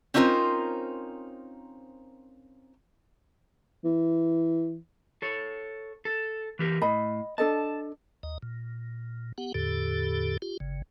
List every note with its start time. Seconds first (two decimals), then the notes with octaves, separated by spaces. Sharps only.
0.14 C4 C#4 D#4 F4 A#4 C5
3.85 E3
5.22 A4 C#5
6.05 A4
6.59 E3 G4 A#4
6.81 A2 D#5 B5
7.38 D4 A4 D#5 A5
8.23 D#2 D#5
8.43 A#2
9.38 B3 G4 F#5
9.54 E2 A2 D3 G4 A4
10.42 F4 G4
10.60 G1 C#3